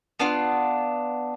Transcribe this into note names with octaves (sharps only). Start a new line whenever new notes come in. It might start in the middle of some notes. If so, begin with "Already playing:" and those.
B3 D4 F4